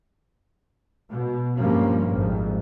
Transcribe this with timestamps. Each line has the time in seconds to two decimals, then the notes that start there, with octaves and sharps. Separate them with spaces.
1.08 B2
1.57 G2 A#2 F3 G3 A#3 C#4
2.09 G#1 F2